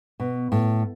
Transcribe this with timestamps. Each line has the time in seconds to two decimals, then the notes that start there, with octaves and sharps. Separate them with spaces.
0.20 B2
0.52 A2